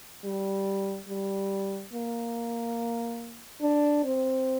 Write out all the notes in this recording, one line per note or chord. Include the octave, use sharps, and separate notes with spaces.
G3
G3
A#3
D4
C4